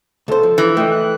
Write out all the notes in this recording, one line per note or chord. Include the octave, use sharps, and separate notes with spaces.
C#2 A4 C5
F3
E3
A3 D#5 G5
F#6